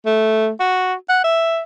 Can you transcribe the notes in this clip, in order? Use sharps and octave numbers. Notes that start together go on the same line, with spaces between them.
A3
F#4
F#5
E5